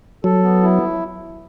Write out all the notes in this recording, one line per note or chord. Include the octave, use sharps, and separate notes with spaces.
F#3 A4
B3
E4